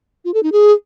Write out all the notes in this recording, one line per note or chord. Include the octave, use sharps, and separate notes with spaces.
F4
A4
D#4
G#4